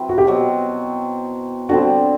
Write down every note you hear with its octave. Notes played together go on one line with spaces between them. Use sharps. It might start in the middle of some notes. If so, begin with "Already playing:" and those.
Already playing: F#3 C4 E4 B4
F#4
G4
B2 F#3 C4
D3 G3 C4 F#4